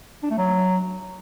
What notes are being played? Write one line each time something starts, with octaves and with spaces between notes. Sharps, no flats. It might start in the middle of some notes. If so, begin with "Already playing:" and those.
D4
A3
F#3